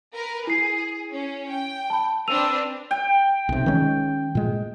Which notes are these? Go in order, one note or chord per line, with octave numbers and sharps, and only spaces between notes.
A#4 B4
E4 G#4 C7
C#4
G5
A5 B5
C4 D4 B4 E6 D#7 F7
G5
B1 C3
D#3 G#3 C#4
A#2 G#3